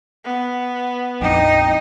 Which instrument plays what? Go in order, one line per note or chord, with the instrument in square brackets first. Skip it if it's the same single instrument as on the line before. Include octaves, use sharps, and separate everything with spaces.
[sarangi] B3
[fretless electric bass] A#1 F2 [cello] D#4 [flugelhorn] G5